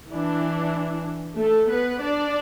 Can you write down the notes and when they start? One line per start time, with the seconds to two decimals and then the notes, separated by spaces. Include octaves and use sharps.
0.11 E3 D4
1.39 A3 A4
1.71 B3 B4
2.03 D4 D5